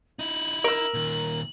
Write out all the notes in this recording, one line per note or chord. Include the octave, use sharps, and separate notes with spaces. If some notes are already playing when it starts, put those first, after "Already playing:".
D#4 E4 F#7
A#4 E6
A#2 D#3